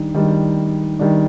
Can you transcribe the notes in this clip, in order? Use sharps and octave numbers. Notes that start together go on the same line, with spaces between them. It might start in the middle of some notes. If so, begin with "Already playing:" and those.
Already playing: D#3 G3 D4
D#3 G3 D4
D#3 G3 D4